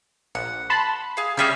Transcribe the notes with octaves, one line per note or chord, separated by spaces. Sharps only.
A#1 F#5
A5 B5 C6
G#4 F5
C#3 G3 C#4 G#4 E5 F6